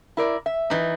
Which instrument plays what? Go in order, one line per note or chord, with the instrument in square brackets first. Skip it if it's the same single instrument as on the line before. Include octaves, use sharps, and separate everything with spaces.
[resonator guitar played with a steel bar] E4 A#4 D5
E5
[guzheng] E3 D#4